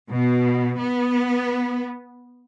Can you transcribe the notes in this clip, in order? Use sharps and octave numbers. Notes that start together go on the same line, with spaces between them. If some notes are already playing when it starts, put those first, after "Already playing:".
B2
B3